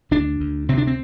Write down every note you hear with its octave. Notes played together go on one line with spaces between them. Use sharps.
D2 D4
D2
C3 C4
D4
C4